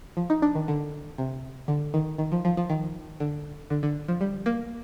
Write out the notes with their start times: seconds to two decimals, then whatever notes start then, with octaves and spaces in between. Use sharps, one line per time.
0.17 F3
0.30 D#4
0.42 D4
0.55 D#3
0.68 D3
1.18 C3
1.68 D3
1.94 D#3
2.18 D#3
2.32 F3
2.45 F3
2.57 F3
2.70 D#3
3.20 D3
3.70 D3
3.83 D3
4.08 F3
4.21 G3
4.46 A#3